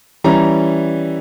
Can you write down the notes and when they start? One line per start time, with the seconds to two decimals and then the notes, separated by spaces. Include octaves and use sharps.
0.24 E3 G3 C#4 A#5